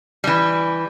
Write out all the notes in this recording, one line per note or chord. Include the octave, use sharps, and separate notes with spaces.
E3 G3